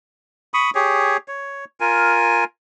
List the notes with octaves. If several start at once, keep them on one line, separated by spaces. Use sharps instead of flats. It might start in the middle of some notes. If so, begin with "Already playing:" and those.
B5 C#6 D#6
G4 G#4 C#5
C#5
F4 A#4 G#5